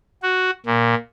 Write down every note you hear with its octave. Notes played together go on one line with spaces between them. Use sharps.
F#4
A#2